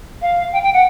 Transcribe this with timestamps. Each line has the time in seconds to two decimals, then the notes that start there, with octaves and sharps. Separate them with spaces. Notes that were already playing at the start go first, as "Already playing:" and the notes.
0.22 F5
0.52 G5
0.62 G5
0.73 F#5